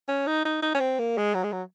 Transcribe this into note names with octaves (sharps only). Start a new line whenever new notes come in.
C#4
D#4
D#4
D#4
C#4
C4
A#3
G#3
F#3
G#3
F#3